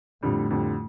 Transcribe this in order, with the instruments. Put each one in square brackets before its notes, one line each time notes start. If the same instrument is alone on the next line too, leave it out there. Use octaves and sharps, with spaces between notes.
[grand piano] F2 D3 G3 [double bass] A2
[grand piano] F2 D3 G3